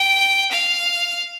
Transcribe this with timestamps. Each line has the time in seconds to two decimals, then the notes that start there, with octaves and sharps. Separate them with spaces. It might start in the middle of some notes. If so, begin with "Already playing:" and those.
Already playing: G5
0.51 F5